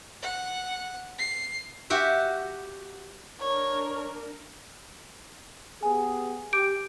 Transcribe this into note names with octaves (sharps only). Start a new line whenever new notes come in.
F#5
C7
F#4 G4 E5
D4 A#4 C#5
B3 G4 G#4 G#5
G4 D6 G6 D7